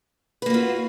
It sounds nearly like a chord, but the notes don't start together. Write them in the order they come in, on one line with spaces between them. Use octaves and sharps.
B4 A#3 F#4 F4